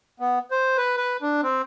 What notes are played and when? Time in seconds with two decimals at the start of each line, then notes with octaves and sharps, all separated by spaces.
0.20 B3
0.51 C5
0.77 B4
0.97 B4
1.22 D4
1.43 C4